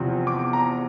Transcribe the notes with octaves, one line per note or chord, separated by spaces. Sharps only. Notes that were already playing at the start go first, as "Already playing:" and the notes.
Already playing: E2 C3 F3 C4
D6
A#5